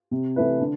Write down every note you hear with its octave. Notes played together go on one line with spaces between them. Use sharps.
C3
E3 A3 E4 B4
D3